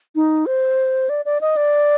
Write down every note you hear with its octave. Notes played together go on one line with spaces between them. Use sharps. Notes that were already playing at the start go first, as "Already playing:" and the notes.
D#4
C5
D5
D5
D#5
D5